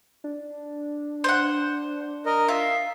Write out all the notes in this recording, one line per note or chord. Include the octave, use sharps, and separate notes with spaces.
D4
C5 F#5
A#4 D#5
F4 E5